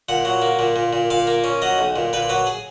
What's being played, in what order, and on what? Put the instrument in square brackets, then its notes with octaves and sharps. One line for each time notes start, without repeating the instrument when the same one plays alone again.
[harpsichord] A#2 F#5
F#3
A#3
A#2
A#2
A#2
A#2 F5
A#3
C#4
F#3 D#5
B1
A#2
A#2 B4
F#3 B4
G#4